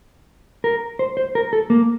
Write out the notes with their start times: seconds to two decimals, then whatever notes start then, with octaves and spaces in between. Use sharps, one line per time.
0.64 A#4
0.99 C5
1.17 C5
1.35 A#4
1.53 A4
1.70 A#3